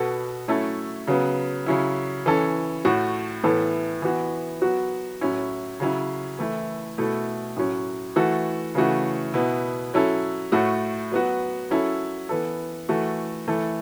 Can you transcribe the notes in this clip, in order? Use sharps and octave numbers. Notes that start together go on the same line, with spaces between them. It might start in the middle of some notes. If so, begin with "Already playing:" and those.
Already playing: B2 B3 F#4 A4
F#3 A3 C#4 E4 A4
C#3 F#3 B3
C#3 F#3 C#4 E4
E3 C#4 A4
A2 A3 F#4
A2 E3 B3 A4
E3 B3 F#4
F#3 B3 F#4
A2 F#3 C#4 E4
C#3 F#3 C#4 E4
E3 A3 E4
B2 A3 E4 A4
A2 F#3 C#4
E3 A3 F#4 A4
C#3 E3 A3 F#4
B2 B3 E4
F#3 C#4 E4 A4
A2 A3 F#4 A4
F#3 B3 F#4
F#3 C#4 E4 A4
E3 B3 A4
E3 A3 F#4 A4
E3 A3 E4 A4